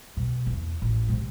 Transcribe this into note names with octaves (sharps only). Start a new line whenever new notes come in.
B2 G3
E2
A1
C3 G#3